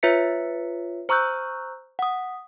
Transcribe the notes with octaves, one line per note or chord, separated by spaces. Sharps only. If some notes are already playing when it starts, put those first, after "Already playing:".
F4 B4 C#5 E5 B6 C#7
C5 A#5 C#6 E6 F#6 G6
F#5 D#6